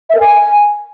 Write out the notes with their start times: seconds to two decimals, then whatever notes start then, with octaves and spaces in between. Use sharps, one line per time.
0.10 E5
0.15 A#4
0.20 G#5